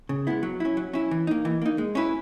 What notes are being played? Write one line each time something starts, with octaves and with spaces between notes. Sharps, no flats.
C#3
G#3 B3 E4
F#3
C#4 E4
F#3
C#4 E4
E3
A#3 D#4
E3
A#3 D#4
G#3
C#4 E4 B4